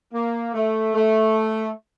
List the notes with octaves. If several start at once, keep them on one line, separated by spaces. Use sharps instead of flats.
A#3
A3
A3